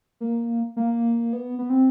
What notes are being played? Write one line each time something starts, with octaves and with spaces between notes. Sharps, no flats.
A#3
A#3
B3
B3
C4